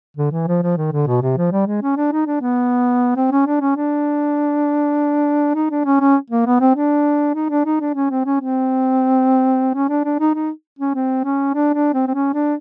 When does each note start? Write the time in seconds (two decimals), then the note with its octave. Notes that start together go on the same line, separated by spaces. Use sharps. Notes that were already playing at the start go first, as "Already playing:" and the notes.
0.17 D3
0.31 E3
0.47 F3
0.62 F3
0.77 D#3
0.92 D3
1.07 B2
1.22 C3
1.37 F3
1.51 G3
1.66 G#3
1.82 C#4
1.96 D4
2.12 D#4
2.26 D4
2.41 B3
3.16 C4
3.31 C#4
3.46 D4
3.61 C#4
3.76 D4
5.55 D#4
5.70 D4
5.85 C#4
6.00 C#4
6.30 A#3
6.46 B3
6.60 C4
6.75 D4
7.35 D#4
7.50 D4
7.65 D#4
7.80 D4
7.95 C#4
8.10 C4
8.25 C#4
8.40 C4
9.74 C#4
9.89 D4
10.04 D4
10.19 D#4
10.34 D#4
10.79 C#4
10.94 C4
11.24 C#4
11.54 D4
11.74 D4
11.94 C4
12.07 C4
12.14 C#4
12.33 D4